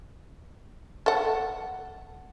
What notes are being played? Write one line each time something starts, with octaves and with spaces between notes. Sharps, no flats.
A4 F#5